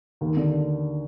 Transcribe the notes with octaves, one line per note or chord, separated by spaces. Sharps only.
D#2
D3